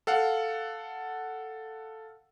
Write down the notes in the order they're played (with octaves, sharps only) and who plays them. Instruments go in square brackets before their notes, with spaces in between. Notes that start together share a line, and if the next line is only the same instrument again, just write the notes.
[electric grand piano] A4 F5 F#5